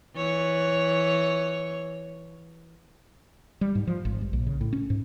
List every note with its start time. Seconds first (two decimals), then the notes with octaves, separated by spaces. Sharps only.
0.16 E3 C#5
3.61 G3
3.75 G#2
3.87 F3
4.05 G#1
4.21 G2
4.33 A#1
4.47 C#3
4.61 A2
4.73 C#4
4.90 G#2